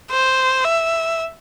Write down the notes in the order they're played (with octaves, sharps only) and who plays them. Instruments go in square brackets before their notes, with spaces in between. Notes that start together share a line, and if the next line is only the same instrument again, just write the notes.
[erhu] C5
E5